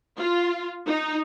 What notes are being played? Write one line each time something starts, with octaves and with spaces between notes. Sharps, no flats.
F4
D#4